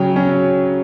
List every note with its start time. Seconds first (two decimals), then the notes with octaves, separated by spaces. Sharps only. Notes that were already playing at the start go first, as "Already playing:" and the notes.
Already playing: C#3 F#3 G5
0.16 C#4